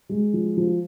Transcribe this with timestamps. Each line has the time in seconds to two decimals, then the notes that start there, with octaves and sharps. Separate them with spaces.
0.09 G#3
0.33 F3
0.57 F3